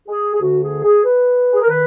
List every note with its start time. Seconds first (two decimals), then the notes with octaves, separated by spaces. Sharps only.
0.09 G#4
0.34 G#4
0.41 D2 D3 F#4
0.62 G#4
0.83 G#4
1.04 B4
1.53 G#4
1.62 A#4
1.69 D#3 B4